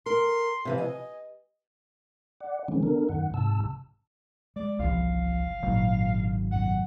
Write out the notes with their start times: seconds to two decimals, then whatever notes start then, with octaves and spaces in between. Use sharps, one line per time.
0.06 A#4 C6
0.65 C3 E3 F3
0.78 D#5 G#5
2.41 D5 F#5
2.68 D3 D#3 F3 G#3 C4 C#4
2.83 B3 D4 A4 A#4
3.09 F#2 D#3 F#5
3.34 G#2 C3 A5 E6
4.56 G#3 D5
4.79 G1 C2 B2 E3 F3 F5
5.63 G#1 A#2 C#3 F#3
6.52 F#2 B2 F#5